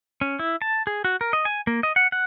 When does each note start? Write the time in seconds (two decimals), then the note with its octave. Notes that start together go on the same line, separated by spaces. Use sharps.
0.21 C#4
0.39 E4
0.62 A5
0.87 G#4
1.04 F#4
1.21 A#4
1.33 D#5
1.45 G#5
1.67 A#3
1.83 D#5
1.96 F#5
2.12 F#5